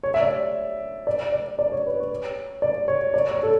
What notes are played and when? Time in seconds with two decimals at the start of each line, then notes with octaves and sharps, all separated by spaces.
0.03 C#5
0.14 E5
0.20 D5
1.07 D5
1.32 D5
1.59 D5
1.72 C#5
1.86 B4
2.00 C#5
2.62 D5
2.88 C#5
3.14 D5
3.31 C#5
3.43 A4